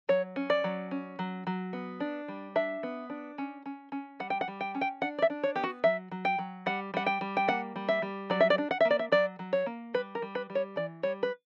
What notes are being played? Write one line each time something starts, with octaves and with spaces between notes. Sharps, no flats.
F#3 C#5
C#4
D5
F#3
C#4
F#3
F#3
B3
D4
G3
D4 E5
B3
D4
C#4
C#4
C#4
G3 F#5
G5
F#5
G3
G5
C#4
G5
D4 F#5
D5
E5
D4
C#5
B3 G4
F#4
F#3 E5
F#3
G5
F#3
G3 F#5
G3 F#5
G5
G3
G5
A#3 F#5
G3
E5
G3
F#3 D5
E5
D5
D4
F#5
E5
A#3
D5
E5
F#3 D5
F#3
C#5
A#3
G3 B4
A#4
G3
B4
G3
C#5
E3 D5
G3 C#5
B4